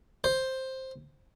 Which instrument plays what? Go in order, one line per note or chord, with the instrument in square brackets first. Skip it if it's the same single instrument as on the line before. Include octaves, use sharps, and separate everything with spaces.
[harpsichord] C5